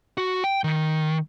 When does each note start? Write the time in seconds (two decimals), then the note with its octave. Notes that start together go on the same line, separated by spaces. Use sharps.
0.18 F#4
0.44 G5
0.64 D#3